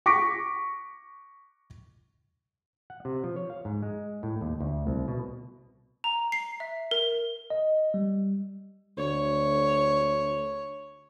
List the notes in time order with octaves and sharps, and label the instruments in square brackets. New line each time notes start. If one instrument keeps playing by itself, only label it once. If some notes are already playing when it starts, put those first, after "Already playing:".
[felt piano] C#6 D6 A#6 B6 D7
[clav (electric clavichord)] F#5
C3
F3
C#5
F5
G#2
G#3
A2
D#2
D2
C2
B2
[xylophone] A#5
C7
E5
A#4
[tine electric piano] D#5
G3
[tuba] D2 [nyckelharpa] C#5